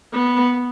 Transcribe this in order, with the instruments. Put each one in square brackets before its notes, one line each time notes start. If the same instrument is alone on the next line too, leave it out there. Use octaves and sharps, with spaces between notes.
[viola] B3